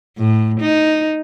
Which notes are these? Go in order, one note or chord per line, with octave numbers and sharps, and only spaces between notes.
A2
D#4